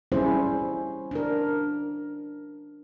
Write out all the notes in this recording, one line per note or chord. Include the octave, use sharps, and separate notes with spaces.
G3 C#4 E4 G#4 C5
D4 A#4